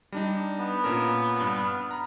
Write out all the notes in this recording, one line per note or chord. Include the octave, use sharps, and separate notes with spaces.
G3 D4 D#4
B3
A#2 C#4 A#4
G2
F6
A#5 B5